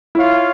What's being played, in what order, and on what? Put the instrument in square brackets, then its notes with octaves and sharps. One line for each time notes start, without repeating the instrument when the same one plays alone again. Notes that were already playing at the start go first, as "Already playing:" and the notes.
[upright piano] E4 [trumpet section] F4 C#5 F5